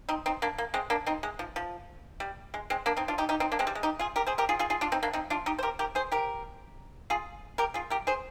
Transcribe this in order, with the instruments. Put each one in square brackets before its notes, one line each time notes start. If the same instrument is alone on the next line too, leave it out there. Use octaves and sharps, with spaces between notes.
[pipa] C4 D#4
C4 D#4
A#3 D4
A#3
G#3 C4
A#3 D4
C4 D#4
G#3
F3
F3
G3
G#3
G#3 C4
A#3 D4
C4 D#4
D4 F4
D#4 G4
D#4 G4
C4 D#4
A#3 D4
G#3 C4
G3
G#3
D#4 G4
F4 G#4
G4 A#4
G#4 C5
G4 A#4
F4 G#4
F4 G#4
F4 G#4
D4 F4
C4 D#4
A#3 D4
C4 D#4
D4 F4
D#4 G4
C5
G4 A#4
G4 A#4
G#4 C5
G4 A#4
F4 G#4
G4 A#4
F4 G#4
G4 A#4
G#4 C5